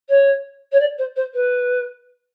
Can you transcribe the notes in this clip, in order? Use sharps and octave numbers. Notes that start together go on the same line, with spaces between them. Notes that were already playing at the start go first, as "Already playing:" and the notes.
C#5
C#5
D5
C5
C5
B4